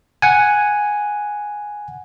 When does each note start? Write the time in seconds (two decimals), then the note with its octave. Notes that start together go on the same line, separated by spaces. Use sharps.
0.22 F#5 G#5